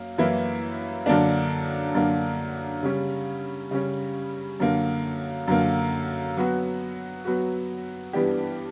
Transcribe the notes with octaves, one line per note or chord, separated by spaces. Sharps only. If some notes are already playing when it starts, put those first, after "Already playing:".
Already playing: F#2 A#3
F#2 E3 A#3 E4
F#2 D3 A#3 D4
F#2 D3 A#3 D4
C#3 G3 C#4
C#3 G3 C#4
F#2 D3 A#3
F#2 D3 A#3
F#3 B3 F#4
F#3 B3 F#4
G2 E3 B3 D4 G4